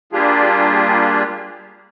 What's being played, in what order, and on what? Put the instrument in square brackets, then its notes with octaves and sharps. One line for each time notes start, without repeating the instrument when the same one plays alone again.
[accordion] G3 A#3 D4 F4 G4 G#4